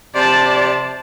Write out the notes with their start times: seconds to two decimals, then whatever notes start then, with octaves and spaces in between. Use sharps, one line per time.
0.15 C3 D5 A5